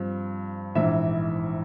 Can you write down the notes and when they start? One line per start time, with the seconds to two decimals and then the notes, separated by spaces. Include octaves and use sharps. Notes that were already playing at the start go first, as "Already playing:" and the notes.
Already playing: G2 F3 C4
0.75 A#1 G#2 E3 E5